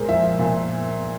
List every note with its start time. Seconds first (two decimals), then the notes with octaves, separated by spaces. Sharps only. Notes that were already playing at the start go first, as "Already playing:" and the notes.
Already playing: A#2 G#3 A#4 C5
0.08 F3 E5
0.39 A#2